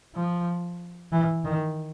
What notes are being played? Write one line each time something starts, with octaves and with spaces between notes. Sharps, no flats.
F3
E3
D#3